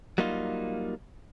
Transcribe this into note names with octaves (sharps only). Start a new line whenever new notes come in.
F#3 G3 A#3 D#4 F4